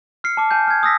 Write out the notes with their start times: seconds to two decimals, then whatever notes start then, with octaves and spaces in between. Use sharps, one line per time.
0.24 F6 C7 C#7
0.37 A5 D6
0.51 G#5 A5 G6
0.68 F6 G#6
0.83 D#6 E6 A#6 B6